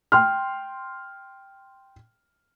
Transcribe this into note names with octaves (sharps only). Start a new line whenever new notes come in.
G5 C6 F6